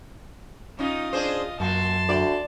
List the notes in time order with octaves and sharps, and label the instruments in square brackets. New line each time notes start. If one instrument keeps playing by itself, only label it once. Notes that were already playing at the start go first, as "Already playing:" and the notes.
[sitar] C#4 D#4 [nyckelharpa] F4 D#5
[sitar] D4 G#4 C5
[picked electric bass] F#2 [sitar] A#2 F#4 [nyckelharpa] A5 C6
[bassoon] D2 [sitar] D5